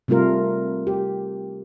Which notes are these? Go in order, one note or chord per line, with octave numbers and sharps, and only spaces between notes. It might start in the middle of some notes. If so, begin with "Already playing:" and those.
C3 G3 A3 F4 A#4
G4